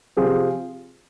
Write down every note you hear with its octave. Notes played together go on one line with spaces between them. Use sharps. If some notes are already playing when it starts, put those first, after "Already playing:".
C3 F3 C4 F4 G#4